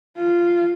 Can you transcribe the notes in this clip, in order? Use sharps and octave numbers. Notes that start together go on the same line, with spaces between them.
F4